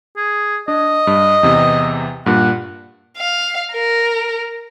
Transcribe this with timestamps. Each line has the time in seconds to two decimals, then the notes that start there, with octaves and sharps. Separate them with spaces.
0.17 G#4
0.68 D4 D#5
1.07 G2
1.43 E2 C3 E3
2.26 G2 A#2 F#5
3.17 F5
3.73 A#4